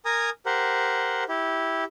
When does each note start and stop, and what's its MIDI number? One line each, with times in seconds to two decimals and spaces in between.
0.05 0.30 70
0.05 0.30 80
0.05 0.30 82
0.05 0.30 87
0.46 1.24 67
0.46 1.24 70
0.46 1.24 72
0.46 1.24 78
1.29 1.84 64
1.29 1.84 67